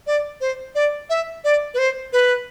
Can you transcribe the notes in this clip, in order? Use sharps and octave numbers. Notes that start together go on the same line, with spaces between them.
D5
C5
D5
E5
D5
B4
C5
B4